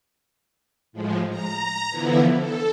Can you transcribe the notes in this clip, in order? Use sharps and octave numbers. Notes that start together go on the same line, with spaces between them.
A2 F3 G#3
A#5
D3 E3 F3 B3 E4
A4